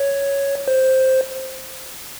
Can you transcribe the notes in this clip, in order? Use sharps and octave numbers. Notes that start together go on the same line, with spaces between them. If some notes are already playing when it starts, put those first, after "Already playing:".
Already playing: C#5
C5